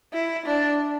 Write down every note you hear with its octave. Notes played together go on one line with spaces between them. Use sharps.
E4
D4